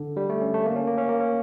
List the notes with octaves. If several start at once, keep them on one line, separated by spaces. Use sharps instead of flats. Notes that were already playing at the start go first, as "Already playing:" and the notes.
Already playing: D3
G3
A3
C#4
A3
A#3
C#4
A#3
C#4
A#3
C#4